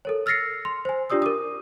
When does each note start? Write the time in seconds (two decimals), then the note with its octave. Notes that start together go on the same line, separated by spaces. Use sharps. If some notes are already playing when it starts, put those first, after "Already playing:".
0.05 A4 A#4 C#5
0.26 E6 F6 A6 A#6 C7 C#7
0.65 C6
0.85 C5 G#5
1.10 D4 F4 G4 D5 D#6 E6
1.22 A#4 D6 D#6